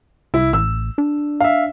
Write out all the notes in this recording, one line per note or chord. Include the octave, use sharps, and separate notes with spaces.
C2 E4
A1 E6
D4
E5 F5